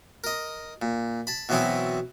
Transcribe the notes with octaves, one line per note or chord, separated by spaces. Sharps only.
A#4 D#5
A#2
A5 B5
B2 E3 F#3 B3 C4 E4